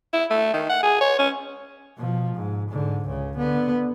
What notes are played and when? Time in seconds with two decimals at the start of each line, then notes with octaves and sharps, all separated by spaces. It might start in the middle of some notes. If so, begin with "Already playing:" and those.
0.13 E4
0.30 A3
0.54 D#3
0.70 F#5
0.83 G#4
1.01 C#5
1.19 C#4
1.97 B2 F3
2.35 G#2
2.70 G#2 D3
3.06 C#2 C#3
3.38 D3 B3